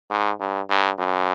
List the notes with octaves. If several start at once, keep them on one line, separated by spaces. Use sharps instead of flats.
G#2
G2
G2
F#2